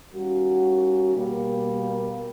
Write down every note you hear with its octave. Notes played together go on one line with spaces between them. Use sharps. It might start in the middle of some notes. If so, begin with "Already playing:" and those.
D#3 G3 A#3 C#4 F#4
B2 G3 A#3